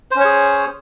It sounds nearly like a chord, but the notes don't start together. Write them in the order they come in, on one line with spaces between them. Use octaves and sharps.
C5 C#4 C#5 G#4